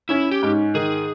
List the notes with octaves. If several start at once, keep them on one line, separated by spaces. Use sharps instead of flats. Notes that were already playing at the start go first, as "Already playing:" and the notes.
C#4 E4
G4
G#2
D#3 G#4